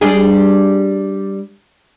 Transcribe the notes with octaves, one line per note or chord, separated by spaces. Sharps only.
G3 D4 G#4